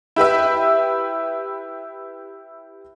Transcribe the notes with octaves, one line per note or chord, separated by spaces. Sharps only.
E4 G4 B4 E5